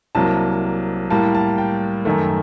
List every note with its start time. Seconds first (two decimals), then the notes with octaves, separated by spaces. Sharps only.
0.15 C2 C3 F#3 A#3 A5
1.10 A2 G3 A#3 A5
1.35 A5
1.58 G5
2.05 F#2 D#3 A3